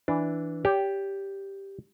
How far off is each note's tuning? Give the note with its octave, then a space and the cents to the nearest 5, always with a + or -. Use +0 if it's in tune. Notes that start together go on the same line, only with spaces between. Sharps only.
E3 +0 D4 +0
G4 +0 C#5 +45